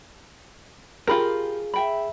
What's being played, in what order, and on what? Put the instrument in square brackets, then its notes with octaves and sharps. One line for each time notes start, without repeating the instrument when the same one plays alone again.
[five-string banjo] F4 A#4 [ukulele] G4 B5 [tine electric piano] G#4
[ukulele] E5 G5 B5